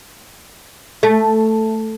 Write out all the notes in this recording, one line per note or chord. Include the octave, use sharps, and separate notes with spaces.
A3